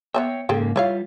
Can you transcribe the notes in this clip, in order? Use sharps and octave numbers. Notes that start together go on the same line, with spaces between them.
B3 C4 C#5 E5 G5
G#2 C#3 A#3 G#4 A4 G5
G3 E4 F4 C#5 F5